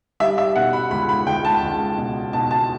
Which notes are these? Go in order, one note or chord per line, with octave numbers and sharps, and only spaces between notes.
G3 E5
E5
B2 F#5
B5
C#2 B5
B5
C#2 G5
A5
C#2
B2
B2 A5
A5